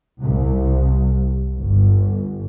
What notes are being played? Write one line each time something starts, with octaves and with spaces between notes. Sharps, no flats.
C2
G1